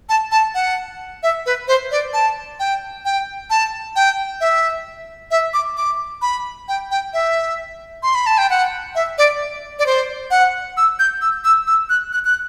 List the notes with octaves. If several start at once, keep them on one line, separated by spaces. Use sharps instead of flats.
A5
A5
F#5
E5
B4
C5
D5
A5
G5
G5
A5
G5
E5
E5
D6
D6
B5
G5
G5
E5
C6
B5
A5
G5
F#5
E5
D5
D5
C5
F#5
E6
G6
E6
E6
E6
F#6
F#6
F#6